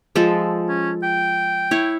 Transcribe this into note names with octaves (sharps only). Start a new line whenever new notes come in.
F3 G#3 A4
C#4
G5
E4 C#5